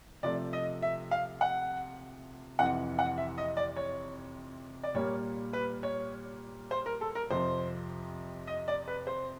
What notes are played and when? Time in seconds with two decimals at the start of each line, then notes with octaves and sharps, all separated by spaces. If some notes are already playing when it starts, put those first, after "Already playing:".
0.23 C3 F3 A3 D5
0.53 D#5
0.82 E5
1.11 F5
1.41 F#5
2.59 F2 C3 E3 F#5
2.99 F#5
3.18 E5
3.38 D#5
3.57 D5
3.76 C#5
4.83 D5
4.95 A#2 G3 A#3 C#5
5.53 B4
5.83 C#5
6.71 C5
6.86 A#4
7.01 A4
7.15 A#4
7.30 F2 C3 F3 C5
8.47 D#5
8.68 D5
8.88 B4
9.07 C5